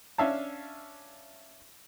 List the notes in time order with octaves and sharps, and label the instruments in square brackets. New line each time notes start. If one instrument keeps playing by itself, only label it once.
[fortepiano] C#4 D4 E5 F5 A5